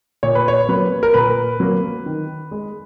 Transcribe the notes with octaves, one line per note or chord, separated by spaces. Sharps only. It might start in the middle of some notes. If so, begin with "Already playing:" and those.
A#2 C#5
B4
C#5
F#3 A#3 B4
A#4
A#2 B4
F#3 A#3
D#3
G#3